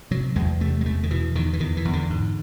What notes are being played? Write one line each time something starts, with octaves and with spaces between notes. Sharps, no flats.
C3 F#3
E2 G#3
C3 A3
G#3
E2 A3
D#3
B2 E3
E2 D#3
E3
E2 D#3
E3
E2
D3
G#2